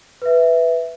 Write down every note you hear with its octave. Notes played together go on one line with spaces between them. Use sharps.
B4 E5